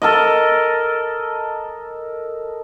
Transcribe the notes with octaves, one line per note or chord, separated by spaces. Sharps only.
A4 A#4 D#5